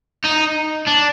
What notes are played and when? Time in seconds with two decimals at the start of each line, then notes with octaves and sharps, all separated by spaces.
0.25 D#4
0.87 D4